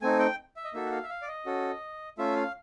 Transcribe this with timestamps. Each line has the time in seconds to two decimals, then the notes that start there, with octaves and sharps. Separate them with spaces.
0.02 A3 C4 D#4 G#5
0.19 G5
0.56 E5
0.64 D#5
0.74 A#3 D#4 F#4 A4 E5
0.86 F#5
0.92 F5
1.03 E5
1.10 F5
1.22 D5
1.28 D#5
1.46 C#4 F#4 A4
2.18 A3 C#4 F4 E5
2.36 F5